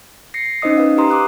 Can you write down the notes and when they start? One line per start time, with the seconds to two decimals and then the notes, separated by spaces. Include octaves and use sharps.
0.34 A#6 C7 C#7
0.62 C#4 D#4 C5 D#5 D#6
0.78 B4 F5
0.98 G4 B4 F5 A#5 C6 D#6
1.10 C6 D6 D#6 F#6